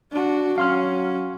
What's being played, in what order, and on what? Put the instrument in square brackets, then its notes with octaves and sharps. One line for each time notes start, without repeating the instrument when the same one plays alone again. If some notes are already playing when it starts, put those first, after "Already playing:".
[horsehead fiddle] D4 F#4
[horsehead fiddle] F#3 C#4 [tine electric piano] F5 C6 F6